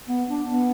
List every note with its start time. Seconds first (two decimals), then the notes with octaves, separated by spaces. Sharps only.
0.09 B3
0.29 D4
0.50 B3